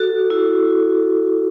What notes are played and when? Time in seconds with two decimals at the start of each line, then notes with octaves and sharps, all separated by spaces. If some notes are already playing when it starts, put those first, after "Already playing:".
Already playing: F#4 A4
0.30 E4